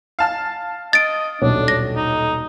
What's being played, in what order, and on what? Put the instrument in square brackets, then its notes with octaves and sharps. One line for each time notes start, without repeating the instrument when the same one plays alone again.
[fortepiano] F5 A5 F6
[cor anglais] D#5 [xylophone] A6 D7
[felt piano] D#1 B1 C#5 [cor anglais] D4
[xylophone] A#6
[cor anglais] D#4